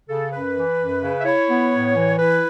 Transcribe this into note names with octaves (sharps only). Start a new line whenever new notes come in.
C#3 A4
F#2 B4
E3
F#2
C#3
E5
E4 C#5
B3
A2
E3
E4 B4